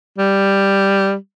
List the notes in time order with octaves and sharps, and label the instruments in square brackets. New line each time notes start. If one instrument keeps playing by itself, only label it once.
[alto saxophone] G3